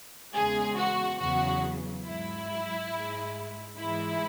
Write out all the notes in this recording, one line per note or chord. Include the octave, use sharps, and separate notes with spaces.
E2 C#3 G#3 G#4
F#4
E2 C#3 F#3 F#4
G#2 F#3 E4
G#2 G#3
G#2 E3 G#3 E4